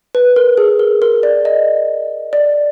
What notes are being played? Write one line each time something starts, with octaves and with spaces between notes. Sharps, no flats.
B4
A#4
G#4
A#4
A#4
D5
D#5
D5